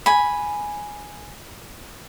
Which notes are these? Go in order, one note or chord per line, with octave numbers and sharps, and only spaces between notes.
G#5 B5